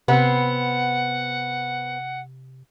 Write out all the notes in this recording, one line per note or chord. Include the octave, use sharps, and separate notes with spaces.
C3 B3 C4 F#5